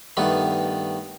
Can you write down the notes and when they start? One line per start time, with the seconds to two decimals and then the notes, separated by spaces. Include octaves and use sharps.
0.17 G2 D#3 A3 B3